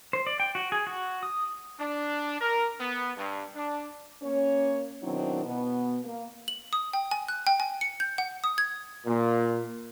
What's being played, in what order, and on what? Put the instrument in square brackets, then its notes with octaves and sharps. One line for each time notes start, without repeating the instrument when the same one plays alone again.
[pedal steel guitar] C5
D5
G5
F#4
G#4
F#4
D#6
[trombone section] D4
A#4
B3
G2
D4
[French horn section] A#3 C#4 C#5
B2 D#3 F#3 C4 D4 E4
B2 B3
A#3
[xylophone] F#7
D#6
G5
G#5
F#6
G5
G#5
C#7
G6
F#5
D#6
G#6
[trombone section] A#2